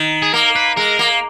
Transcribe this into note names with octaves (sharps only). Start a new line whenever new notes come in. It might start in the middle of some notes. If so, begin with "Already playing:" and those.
Already playing: D#3
G#4
A#3 A#4
B4
G#3 A#4
A#3